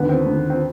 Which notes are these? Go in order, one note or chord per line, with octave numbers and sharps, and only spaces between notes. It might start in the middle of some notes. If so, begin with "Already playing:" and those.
Already playing: D#2 D3 B3
C4
D#2 D3
C4